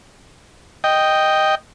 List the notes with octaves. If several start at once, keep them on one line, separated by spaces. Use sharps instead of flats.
D#5 G5